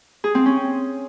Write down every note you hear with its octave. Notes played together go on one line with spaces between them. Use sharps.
G#4
C4
C#4